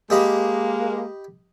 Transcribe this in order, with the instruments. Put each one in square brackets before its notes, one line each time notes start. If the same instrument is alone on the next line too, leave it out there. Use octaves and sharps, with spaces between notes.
[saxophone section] G#3 A#3 [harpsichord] G4 D#5 B5